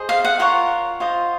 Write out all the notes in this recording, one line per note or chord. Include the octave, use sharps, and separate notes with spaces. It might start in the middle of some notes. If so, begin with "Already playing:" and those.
Already playing: G#4 C5 D#5
F5
F#5
F4 A#4 C#5 F#5
F4 C5 D#5